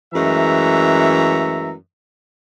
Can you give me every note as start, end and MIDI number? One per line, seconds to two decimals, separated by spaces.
0.14 1.74 42
0.14 1.74 52
0.14 1.74 56
0.14 1.74 57
0.14 1.74 76
0.14 1.74 82